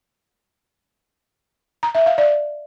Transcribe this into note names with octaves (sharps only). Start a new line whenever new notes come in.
A#5
E5
F5
D5